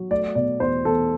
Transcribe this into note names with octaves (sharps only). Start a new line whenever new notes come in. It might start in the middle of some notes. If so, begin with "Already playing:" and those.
Already playing: F#3
A3 D5
B2 D5
E2 C5
E2 A4